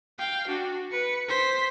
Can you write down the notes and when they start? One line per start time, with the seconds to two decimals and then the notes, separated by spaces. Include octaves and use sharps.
0.19 F5 G5
0.48 D4 F#4
0.92 B4 C#7
1.28 C5 B6